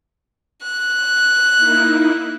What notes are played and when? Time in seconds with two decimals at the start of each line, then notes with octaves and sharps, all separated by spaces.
0.63 F#6
1.57 A#3 D#4 E4